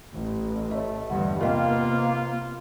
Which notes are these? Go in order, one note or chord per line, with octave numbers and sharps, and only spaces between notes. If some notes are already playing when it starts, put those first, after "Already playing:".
A1
A3 C#5 D#5
E2 G2 D3 F#5
C3 A#3 B3 F4 A#4 D#5 G5